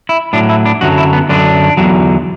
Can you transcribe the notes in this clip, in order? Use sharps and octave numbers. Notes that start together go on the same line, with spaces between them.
E4
A2 F#3 D4
E4
D4
F#2 D3 F#3 F#4
E4
B3
F#2 D3 F#3 D4
E2 D3 F#3